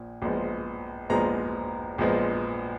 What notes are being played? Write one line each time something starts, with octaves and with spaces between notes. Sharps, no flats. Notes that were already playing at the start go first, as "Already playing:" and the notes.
Already playing: A#1 A#2 F3
A#1 A#2 F3 G#3 B3
A#1 A#2 F3 G#3 B3 A#5
A#1 A#2 F3 G#3 B3